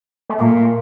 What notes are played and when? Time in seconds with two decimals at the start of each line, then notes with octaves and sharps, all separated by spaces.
0.29 A3
0.39 A#2 A#3